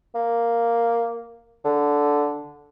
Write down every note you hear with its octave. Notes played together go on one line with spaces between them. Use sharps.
A#3
D3